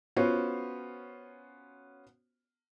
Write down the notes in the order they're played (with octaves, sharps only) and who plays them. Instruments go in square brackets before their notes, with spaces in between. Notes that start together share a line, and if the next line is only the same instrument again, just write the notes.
[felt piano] B3 C#4 F4 F#4 C5 C#5